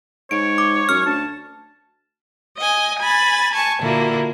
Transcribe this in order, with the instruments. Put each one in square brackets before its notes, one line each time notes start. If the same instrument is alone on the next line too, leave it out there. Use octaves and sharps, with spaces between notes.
[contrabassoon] G#2 [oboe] C#5 [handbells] D7
[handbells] D6
[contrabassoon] F#2 [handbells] F6
[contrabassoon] D2 [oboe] A5
[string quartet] D#5 G#5
G#5 B5 A6
G#5 A5 C#6
A#2 D3 A#3 E4 F#4